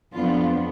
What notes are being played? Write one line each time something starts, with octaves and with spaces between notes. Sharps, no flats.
F2 F3 B3 D4 F4